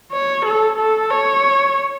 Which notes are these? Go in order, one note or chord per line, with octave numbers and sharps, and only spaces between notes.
C#5
A4
A4
C#5